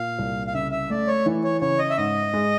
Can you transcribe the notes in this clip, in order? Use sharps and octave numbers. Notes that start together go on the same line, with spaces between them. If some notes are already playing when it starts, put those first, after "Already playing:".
Already playing: A#2 F5
C2
F5
C#3 E5
E5
A3 D5
C#5
E3
C#5
C#3 C#5
D#5
E5
G#2 D#5
G#3